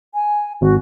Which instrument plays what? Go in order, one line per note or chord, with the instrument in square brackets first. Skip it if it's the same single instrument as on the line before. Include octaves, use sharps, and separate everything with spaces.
[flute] G#5
[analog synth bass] G#1 [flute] F#4